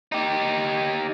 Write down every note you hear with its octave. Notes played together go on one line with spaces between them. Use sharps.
D#4 G4